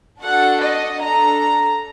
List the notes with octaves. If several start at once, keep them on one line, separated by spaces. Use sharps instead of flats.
D4 F#4 A4 F#5
D#5
D4 A4 A#5